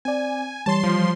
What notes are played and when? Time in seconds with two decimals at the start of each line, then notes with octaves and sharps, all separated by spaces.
0.05 C4 D5 G#5
0.66 E3 G3 C#5 A5 C6
0.80 F3 C6